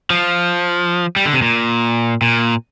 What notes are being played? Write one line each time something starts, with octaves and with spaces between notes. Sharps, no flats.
F3
G3
D3
C3
A#2
A#2